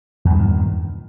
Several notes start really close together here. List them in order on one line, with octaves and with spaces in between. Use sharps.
E2 G2 D#3 A#2